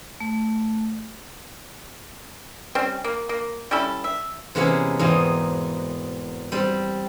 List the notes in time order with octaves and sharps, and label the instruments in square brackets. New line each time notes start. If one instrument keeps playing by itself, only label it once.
[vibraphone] A3
[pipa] G3 C4 C#4
A#3
A#3
G3 C#4 E4 A4
E5
[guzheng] C3 E3 G#3 A#3 B3 C#4
E2 G#2 B2 A#3 C4 D#5
G3 C4